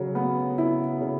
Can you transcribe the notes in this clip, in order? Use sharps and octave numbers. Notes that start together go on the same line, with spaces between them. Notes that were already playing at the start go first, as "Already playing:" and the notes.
Already playing: C#3 F#3
B3
E4
C#3